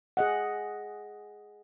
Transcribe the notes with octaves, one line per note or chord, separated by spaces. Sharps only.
G#4 D#5 F#5